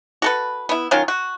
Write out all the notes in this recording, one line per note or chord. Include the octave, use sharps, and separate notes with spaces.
F#4 A4 B4
B3 E4
D#3 F#3 C#4 F4
F#4